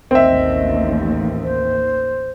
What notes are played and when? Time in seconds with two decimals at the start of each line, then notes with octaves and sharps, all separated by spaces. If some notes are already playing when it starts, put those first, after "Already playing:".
0.11 A1 D#2 C4 D#5 E5
1.42 C5